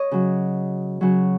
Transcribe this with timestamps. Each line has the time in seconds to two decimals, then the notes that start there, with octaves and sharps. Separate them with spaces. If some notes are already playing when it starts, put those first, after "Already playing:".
Already playing: C#5 D#5
0.12 C#3 F#3
1.01 C#3 F#3